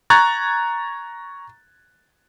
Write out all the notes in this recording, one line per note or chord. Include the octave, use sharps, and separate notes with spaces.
A#5 C#6 F#6 G#6 A6